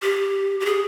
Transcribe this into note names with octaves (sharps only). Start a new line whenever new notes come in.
G4
G4
G#4